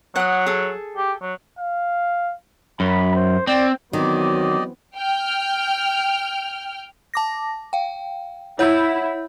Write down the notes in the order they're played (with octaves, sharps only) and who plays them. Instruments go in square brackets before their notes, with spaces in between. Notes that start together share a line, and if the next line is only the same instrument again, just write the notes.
[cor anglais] F#3 [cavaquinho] F#5 D#6
[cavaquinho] G#4 A4
[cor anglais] G4
F#3
[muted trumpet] F5
[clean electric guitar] F#2 [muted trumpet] B5
[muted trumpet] C5
[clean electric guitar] C4 [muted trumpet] D5
[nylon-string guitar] D#3 [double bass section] E3 B3 C4 [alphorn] F#3 [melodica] G4 D5 D#5
[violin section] G5 F6
[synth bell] A5 D6 A#6
F5 G5
[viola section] E4 [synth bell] C#5 F#5 G6